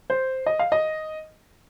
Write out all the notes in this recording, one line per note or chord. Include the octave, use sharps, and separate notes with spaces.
C5
D#5
F5
D#5